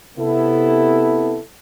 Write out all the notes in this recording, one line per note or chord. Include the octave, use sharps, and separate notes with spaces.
C3 B3 E4 A4